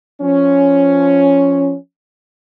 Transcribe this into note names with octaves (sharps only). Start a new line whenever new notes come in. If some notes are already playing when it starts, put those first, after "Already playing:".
F3 C#4